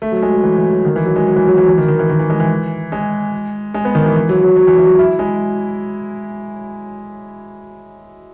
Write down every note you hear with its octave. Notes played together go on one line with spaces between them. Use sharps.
A3
F#3
G#3
F#3
E3
E3
F#3
D#3
E3
F#3
G#3
F#3
E3
F#3
E3
E3
D#3
D#3
E3
D#3
E3
G#3
E3
G#3
G#3
B3
D#3
E3
E3
F#3
F#3
F#3
E3
E3
F#3
E4
G#3